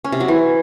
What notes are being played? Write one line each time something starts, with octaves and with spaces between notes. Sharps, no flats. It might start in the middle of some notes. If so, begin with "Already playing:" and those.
C#4
C3
F#3
E3